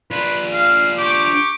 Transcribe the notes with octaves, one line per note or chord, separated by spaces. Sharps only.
D4 F4 B4
F5
G4 C#6 D6